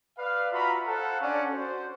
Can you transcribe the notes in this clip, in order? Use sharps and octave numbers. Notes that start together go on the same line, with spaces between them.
B4 D5 F5
F4 F#4 E5 A#5 B5
A4 C5 F5 F#5
C#4 D4 C#5 D5 F#5
F#4 C5